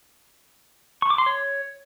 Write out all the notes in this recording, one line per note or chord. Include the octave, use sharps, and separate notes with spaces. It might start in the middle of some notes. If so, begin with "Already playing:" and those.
C#6
D6
C6
C#5